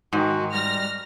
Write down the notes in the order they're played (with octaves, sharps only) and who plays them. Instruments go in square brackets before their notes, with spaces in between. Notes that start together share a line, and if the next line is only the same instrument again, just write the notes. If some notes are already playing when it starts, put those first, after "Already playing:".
[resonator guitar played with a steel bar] G#2 [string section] D#3 [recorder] F#4
[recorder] G3 [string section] F6 A#6